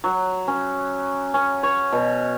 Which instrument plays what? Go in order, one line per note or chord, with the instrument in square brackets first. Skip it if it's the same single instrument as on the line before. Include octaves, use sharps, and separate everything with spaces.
[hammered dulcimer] F#3
C#4
C#4
C#5
B2